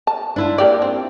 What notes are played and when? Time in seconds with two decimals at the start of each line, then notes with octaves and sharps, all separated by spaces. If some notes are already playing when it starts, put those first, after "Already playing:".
0.07 A5
0.36 D4 E4 F4
0.58 A#3 G4 D5
0.82 C4